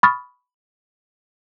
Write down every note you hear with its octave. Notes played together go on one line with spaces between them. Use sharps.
B5 C#6 D#6 F6 A6